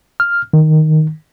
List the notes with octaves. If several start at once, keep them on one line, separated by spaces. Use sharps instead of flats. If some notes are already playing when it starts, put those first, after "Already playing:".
F6
D#3